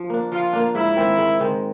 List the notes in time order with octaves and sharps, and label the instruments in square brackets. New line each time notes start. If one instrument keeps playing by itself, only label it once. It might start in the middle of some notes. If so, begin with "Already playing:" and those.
Already playing: [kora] F3
A#3 D4
[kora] F3 [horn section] F4
[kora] A#3 D4
[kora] G#2 [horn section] E4
[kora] D#3 G#3 C4
G#2
D#3 G#3 C4